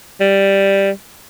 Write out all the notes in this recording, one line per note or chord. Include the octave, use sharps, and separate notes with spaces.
G3